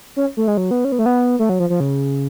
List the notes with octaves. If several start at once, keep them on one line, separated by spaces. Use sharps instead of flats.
C#4
A3
G#3
F#3
B3
C#4
B3
A3
B3
A3
F#3
F3
F3
C#3